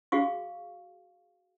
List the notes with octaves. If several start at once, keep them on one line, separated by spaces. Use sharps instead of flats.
F#4 G#4 F5 C#6